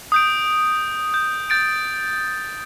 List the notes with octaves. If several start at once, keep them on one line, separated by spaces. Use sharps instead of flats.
D#6 G6 D7
G6
G6 A6 D7